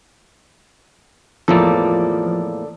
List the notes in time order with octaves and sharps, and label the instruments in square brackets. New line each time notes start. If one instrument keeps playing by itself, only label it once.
[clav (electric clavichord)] E2 A2 A#3 [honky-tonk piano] F3 [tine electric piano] A4 D5